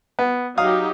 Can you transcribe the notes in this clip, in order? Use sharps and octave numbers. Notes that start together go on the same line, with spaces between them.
B3
F#3 D#4 G4 F5 D#6